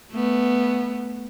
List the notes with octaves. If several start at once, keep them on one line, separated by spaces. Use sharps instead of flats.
A3 B3